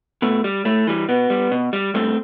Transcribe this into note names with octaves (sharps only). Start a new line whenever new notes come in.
B2 A3
G3
A2 A3
E3 G3
B2 B3
G3
B2
G3
G2 A3 C4